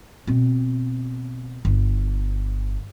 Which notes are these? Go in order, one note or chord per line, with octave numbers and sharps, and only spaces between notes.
B2 C4
G1